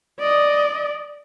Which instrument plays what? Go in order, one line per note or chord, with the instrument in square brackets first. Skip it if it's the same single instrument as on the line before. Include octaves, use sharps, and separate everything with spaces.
[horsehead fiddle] D5 D#5